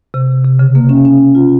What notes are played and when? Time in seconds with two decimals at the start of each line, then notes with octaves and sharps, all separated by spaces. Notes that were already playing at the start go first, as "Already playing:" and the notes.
0.14 C3
0.45 C3
0.59 C#3
0.75 A#3
0.89 C#4
1.05 C#4
1.35 F4